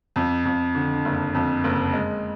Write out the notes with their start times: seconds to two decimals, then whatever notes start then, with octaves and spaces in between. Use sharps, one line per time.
0.16 F2
0.45 F2
0.75 D3
1.05 F#1
1.35 F2
1.64 F#1
1.93 G#3